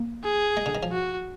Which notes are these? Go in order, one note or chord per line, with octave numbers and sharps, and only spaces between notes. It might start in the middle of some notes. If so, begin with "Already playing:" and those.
Already playing: A#3
G#4
G#3
D3
D#3
F3
F#4